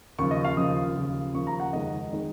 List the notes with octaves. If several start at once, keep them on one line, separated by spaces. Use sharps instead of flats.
D#2 C#3 F3 C#6
D#5
F5
D#2 C#3 F3 D#6
D#2 C#3 F3
D#2 C#3 F3 C#6
A#5
F#5
F2 D#3 G#3 D#5
D#3 G#3